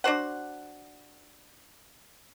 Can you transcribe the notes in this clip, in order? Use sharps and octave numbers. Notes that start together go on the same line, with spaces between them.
D4 F#4 C5 F#5